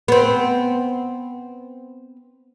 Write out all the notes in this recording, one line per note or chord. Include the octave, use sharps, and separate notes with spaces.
B3 C4